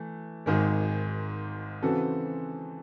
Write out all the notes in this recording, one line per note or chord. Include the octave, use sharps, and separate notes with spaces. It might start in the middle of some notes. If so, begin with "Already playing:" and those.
Already playing: E3 A3
G#1 G#2 D#3 G#3
C#3 E3 C4 F#4 A4